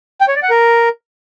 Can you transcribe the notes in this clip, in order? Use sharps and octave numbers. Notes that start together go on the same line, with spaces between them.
G5
C#5
D5
F#5
A#4